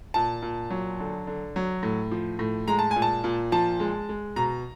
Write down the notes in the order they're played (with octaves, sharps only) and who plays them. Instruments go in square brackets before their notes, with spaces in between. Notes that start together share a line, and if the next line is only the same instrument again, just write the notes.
[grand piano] A#2 A5
A#2
F#3
D3
D3
F#3
A2
F3
A2
G#3 A#5
A5
A#2 G#5
A5
A#2
F3 A5
G#3
G#3
B2 A#5